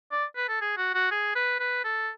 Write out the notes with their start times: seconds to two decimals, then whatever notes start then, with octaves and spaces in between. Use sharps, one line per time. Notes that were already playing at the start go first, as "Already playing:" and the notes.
0.12 D5
0.36 B4
0.49 A4
0.61 G#4
0.77 F#4
0.94 F#4
1.11 G#4
1.35 B4
1.60 B4
1.84 A4